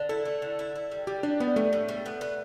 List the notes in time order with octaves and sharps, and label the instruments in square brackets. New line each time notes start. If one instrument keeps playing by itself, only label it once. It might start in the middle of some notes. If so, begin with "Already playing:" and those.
Already playing: [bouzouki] D3
[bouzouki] E4 [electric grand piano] A4
[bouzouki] A3
D3
E4
E4
G3
[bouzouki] G3 [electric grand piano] G4
[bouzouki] G3 [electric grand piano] D4
[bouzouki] G3 [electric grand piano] B3
[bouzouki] A2 [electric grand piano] A3
[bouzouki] A2
G3
B3
B3